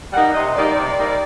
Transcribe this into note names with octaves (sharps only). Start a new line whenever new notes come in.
G3 A#3 D#4 F#5
C3 D#5
G3 A#3 D#4 D5
C3
G3 A#3 D#4